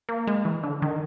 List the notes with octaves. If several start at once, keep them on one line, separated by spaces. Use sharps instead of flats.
A#3
G#3
E3
D3
D#3